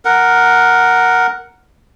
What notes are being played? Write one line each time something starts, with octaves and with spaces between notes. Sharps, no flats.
A#4 F#5